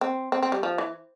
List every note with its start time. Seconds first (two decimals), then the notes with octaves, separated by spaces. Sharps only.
0.01 C4
0.32 C4
0.43 C4
0.52 G3
0.63 F3
0.78 E3